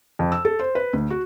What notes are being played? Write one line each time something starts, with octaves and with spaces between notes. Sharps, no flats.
F2
E6
A4
C5
B4
D2
F#4